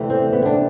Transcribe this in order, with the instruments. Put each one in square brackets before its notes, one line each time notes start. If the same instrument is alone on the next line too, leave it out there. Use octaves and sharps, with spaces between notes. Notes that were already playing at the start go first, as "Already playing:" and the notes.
Already playing: [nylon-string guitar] D2 C3 E3 A3
C4
B3
D4